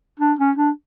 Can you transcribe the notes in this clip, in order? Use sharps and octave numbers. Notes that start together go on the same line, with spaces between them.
D4
C#4
D4